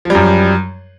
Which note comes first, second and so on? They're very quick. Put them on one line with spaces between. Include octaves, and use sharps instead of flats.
F3 G3 F#2